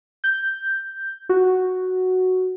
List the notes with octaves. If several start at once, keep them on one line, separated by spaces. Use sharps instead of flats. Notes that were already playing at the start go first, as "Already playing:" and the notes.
G6
F#4